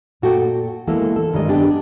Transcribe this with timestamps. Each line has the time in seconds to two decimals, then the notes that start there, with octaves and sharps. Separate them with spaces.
0.22 A#2 F#4 A4 G5
0.87 E3 G#3 A#3 B3 E4 A4
1.16 A4
1.33 G2 D#3 G3 G#3 D#5
1.49 B3 D4 G4 G#4 D#5